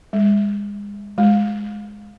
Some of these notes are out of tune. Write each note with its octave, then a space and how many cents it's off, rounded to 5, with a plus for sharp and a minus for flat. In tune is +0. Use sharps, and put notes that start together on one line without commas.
G#3 -35
G#3 +5